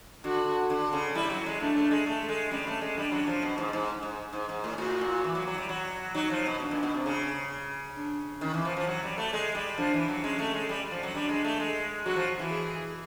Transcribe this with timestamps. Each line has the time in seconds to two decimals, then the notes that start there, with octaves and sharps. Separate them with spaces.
0.24 D3 F#4
0.70 D3
0.93 C#3
1.15 G3 E4
1.30 F#3
1.46 G#3
1.60 A3 D4
1.77 A3
1.91 G#3
2.06 A3
2.29 G#3
2.51 G3 C#4
2.67 A3
2.81 G#3
2.97 G3 D4
3.12 F#3
3.27 F3
3.42 B2
3.58 G#2
3.73 G#2
4.03 G#2
4.33 G#2
4.49 G#2
4.64 A2
4.78 A2 F#4
5.01 A#2
5.24 E3
5.35 F#3
5.47 F#3
5.58 G3
5.69 F#3
6.15 F#3 D#4
6.30 F3
6.46 B2
6.60 B2 D4
6.71 A#2
6.83 B2
6.94 C3
7.06 C#3
7.97 D4
8.41 D#3 C#4
8.54 E3
8.65 F3
8.77 F3
8.87 F#3
9.03 G3
9.18 A3
9.33 G#3
9.55 G3
9.78 F3 D4
9.94 E3
10.08 F#3
10.24 G#3 C#4
10.39 A3
10.54 G#3
10.69 G3
10.91 F3
11.03 F#3
11.14 G3 D4
11.29 G#3
11.44 A3
11.60 G#3
12.06 F#3 F#4
12.16 F3
12.39 E3
12.50 G#4